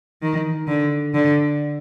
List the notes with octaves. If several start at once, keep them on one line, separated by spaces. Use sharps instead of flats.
D#3
D3
D3